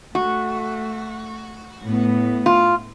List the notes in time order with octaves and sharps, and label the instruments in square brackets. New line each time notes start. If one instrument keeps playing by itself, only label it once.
[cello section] A3 [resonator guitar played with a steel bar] F#4
[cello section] A2 B3
[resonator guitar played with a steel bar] F4